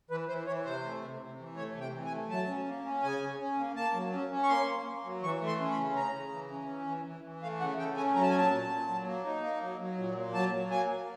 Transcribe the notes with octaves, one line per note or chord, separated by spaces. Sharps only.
E3 B4
E3 C5
E3 C#5
C3 C5
A3
C3
C3
E3
A3 C#5
C3 G5
E3
G#5
A3
F#3 A5
C#4
A#3
C#4
C#3 G#5
C#4
C#4
A#3
A#3 A5
F#3
C#4
C#4
C#6
A#3 C6
A#3
A#3
F#3
E3 C#6
A3
C6
C#4
B5
C#3
C#3 A#5
C#3
E3
C#4
E3
E3
E3
E3
A3 F5
C#3 F#5
A3 G5
C#4 G#5
F#3 A#5
A5
G#5
A#2 A5
A#2
A#2
F#3
A#3
D#4
A#3
F#3
F#3
A#2
A#3
F#3 A5
F#3
A#3 G#5
A#3